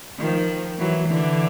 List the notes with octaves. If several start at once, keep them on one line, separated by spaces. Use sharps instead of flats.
D#3 F3
E3 F#3
D3 E3